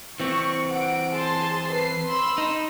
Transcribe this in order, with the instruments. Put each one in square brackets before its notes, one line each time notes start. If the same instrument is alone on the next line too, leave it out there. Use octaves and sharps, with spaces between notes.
[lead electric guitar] E3 C4 [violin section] C#6
[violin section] F#5 D7
G#4 A5 C6
B4 C7
B5 C6 E6
[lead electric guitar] D#4